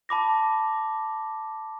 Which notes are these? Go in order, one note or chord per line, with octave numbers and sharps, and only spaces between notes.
A5 B5 D6 A#6